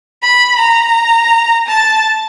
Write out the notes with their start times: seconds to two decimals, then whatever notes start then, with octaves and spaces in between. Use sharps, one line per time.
0.22 B5
0.59 A#5
1.67 A5